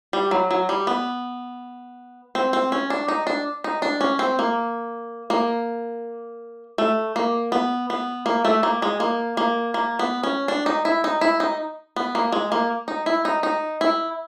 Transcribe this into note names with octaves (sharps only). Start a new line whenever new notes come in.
G3
F#3
F#3
G3
B3
C4
C4
C#4
D4
D#4
D4
D#4
D4
C#4
C4
A#3
A#3
A3
A#3
B3
B3
A#3
A3
A#3
G#3
A#3
A#3
A#3
B3
C#4
D4
D#4
E4
D#4
E4
D#4
B3
A#3
G#3
A#3
D#4
E4
D#4
D#4
E4